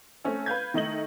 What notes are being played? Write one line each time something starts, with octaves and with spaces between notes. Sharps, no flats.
A3 C4 C#4 A4
B4 F5 G6 G#6
D#3 A3 D#5 F#7